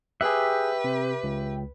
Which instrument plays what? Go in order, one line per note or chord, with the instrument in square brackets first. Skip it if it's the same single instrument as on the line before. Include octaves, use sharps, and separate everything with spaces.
[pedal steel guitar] G4 E5 [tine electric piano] G#4 F#6 [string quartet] B4
[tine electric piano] C3
C#2